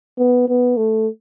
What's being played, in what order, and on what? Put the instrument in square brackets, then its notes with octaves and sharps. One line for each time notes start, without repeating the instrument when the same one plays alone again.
[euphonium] B3
B3
A3